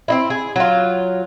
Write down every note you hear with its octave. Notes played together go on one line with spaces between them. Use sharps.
C4 D#4 E4
G#4
F#3 F4